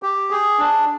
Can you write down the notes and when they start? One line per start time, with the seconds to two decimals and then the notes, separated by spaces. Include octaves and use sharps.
0.03 G4
0.31 G#4
0.59 D4